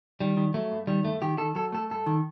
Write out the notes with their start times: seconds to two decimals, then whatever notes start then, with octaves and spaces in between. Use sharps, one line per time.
0.20 D#3 G3
0.37 D#3
0.54 F#3 A3
0.72 G2
0.87 D#3 G3
1.05 G2 A3
1.22 D#3 G4
1.38 D#3 A4
1.55 F#3 A4
1.72 A3 A4
1.90 G2 A4
2.06 D#3